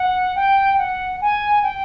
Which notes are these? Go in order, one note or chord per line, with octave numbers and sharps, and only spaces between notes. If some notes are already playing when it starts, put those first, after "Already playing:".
Already playing: F#5
G5
F#5
G#5
G5